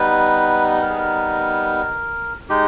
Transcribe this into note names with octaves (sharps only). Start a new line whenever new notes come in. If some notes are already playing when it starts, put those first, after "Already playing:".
Already playing: G3 B3 D#4 B4
A#4
G#4
A#4
G#3 D#4 G4